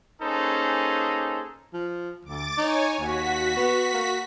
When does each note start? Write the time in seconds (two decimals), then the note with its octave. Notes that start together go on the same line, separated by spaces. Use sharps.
0.22 A#3 C#4 D#4 G#4 A4 C5
1.73 F3
2.25 D2 D6 A6
2.58 D#4 C#5 G#5
2.99 D#2 F#4 B6
3.57 B3
3.94 A#3